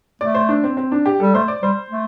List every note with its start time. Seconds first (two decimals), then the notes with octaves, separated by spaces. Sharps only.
0.21 A3 D5
0.35 C5
0.49 D4
0.64 C4
0.77 C4
0.92 D4
1.06 G4
1.20 G3 A4
1.35 A3 C5
1.48 D5
1.62 G3 C5
1.90 A3